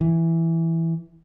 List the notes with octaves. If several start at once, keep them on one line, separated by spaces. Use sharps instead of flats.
E3